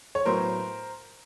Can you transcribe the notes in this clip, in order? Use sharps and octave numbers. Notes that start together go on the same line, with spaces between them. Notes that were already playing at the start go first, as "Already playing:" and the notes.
C#5
A2 F#3 B3 A#4 C5